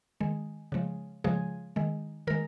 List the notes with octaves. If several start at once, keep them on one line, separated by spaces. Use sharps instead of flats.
D#3 G#3
C#3 F3 G#3
C#3 F3 G#3 G#4
D#3 G#3
D#3 G#3 A#4